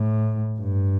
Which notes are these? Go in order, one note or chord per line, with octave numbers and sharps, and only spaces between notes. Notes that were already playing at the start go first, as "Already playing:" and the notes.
Already playing: A2
G2